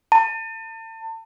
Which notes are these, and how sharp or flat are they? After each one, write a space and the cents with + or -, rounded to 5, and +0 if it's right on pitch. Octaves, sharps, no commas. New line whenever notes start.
A5 +35